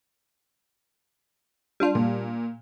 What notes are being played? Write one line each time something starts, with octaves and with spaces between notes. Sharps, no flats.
G3 D4 F4
A#2